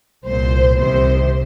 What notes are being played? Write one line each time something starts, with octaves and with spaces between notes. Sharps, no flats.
C2 A#2 C5
C2 C3 D#3 C5